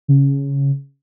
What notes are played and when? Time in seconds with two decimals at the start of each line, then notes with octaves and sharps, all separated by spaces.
0.08 C#3